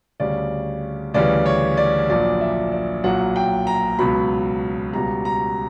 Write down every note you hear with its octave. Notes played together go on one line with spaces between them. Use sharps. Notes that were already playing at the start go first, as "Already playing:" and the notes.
D2 C#3 G3 D5
D2 C#3 E3 G3 D5
C#5
D5
A#1 A#2 F#3 D5
E5
D5
B1 A#2 F#3 F#5
G5
A#5
C#2 B2 F#3 B5
C#2 B2 G3 A#5
A#5